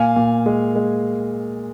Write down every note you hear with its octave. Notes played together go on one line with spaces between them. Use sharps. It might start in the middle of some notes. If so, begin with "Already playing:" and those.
Already playing: A#2 F5 G#5
A#2
G#3
G#3